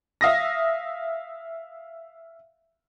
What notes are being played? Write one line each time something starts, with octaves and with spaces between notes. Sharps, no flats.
E5 F5 D#6 A#6